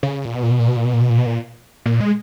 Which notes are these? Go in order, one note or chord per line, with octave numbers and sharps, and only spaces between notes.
C#3
A#2
B2
A#2
B2
A#2
B2
A#2
B2
A#2
B2
A#2
B2
A#2
A#2
G#3